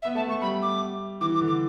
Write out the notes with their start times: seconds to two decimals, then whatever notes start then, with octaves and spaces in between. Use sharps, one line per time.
0.02 E5
0.05 B3
0.15 A3 A5
0.29 A3 C#6
0.41 G3 B5
0.62 D6
1.21 E3 D6
1.35 D6
1.41 D3
1.48 D6